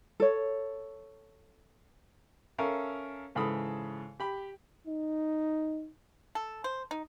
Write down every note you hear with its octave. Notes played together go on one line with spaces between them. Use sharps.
A4 C#5
C#4 A4 A#4 E5 F5
G#2 C#3 E3 A4 B5 D#6
G4 B5
D#4
A4
C5
D#4